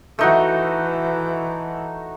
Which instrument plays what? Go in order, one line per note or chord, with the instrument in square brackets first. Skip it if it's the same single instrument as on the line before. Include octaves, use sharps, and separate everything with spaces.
[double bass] E3 [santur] A3 D#4 F#4